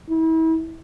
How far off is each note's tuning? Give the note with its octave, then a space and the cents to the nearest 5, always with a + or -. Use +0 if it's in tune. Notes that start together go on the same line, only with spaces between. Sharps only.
E4 -35